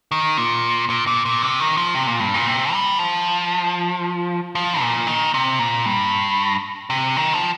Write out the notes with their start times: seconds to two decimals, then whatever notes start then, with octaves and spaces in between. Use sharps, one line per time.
0.11 D#3
0.38 A#2
0.90 A#2
1.07 A#2
1.25 A#2
1.42 C3
1.60 D#3
1.77 F3
1.95 C3
2.07 A#2
2.20 G2
2.34 A#2
2.47 C3
2.73 G3
2.99 F3
4.55 F3
4.81 A#2
5.07 D#3
5.34 C3
5.59 A#2
5.86 G2
6.90 C3
7.16 D#3
7.33 F3